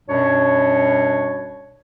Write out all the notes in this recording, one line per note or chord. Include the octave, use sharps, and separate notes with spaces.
F#2 B2 G3 D4 C#5